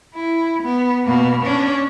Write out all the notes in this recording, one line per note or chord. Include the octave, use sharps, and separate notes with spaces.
E4
B3
B2 A#3
C#4 D4